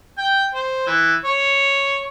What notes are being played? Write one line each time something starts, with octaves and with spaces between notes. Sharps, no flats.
G5
C5
E3
C#5